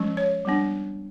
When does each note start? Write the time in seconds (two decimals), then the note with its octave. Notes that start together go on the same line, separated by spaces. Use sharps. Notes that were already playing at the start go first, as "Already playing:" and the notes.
Already playing: F3 G#3 C#4
0.17 C#5
0.45 G3 B3 D4